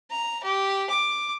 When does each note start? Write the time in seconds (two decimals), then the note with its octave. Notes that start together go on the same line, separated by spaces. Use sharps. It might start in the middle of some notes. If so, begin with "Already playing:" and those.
0.11 A#5
0.43 G4
0.90 D6